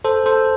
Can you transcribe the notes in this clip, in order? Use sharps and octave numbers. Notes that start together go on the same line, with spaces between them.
A4 C5
A4 C5